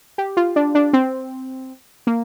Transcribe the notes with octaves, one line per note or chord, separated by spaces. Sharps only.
G4
F4
D4
D4
C4
A#3